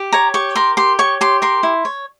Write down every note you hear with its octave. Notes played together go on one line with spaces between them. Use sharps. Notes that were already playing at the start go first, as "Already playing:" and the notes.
Already playing: G4
C#5 A#5
G4 C#6
A#4 C6
G4 C6
C#5 C#6
G4 C6
A#4 C6
E4
C#5